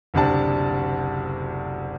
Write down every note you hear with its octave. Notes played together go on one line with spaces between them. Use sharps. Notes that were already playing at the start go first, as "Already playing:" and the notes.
F#1 D2 C3 D4 A5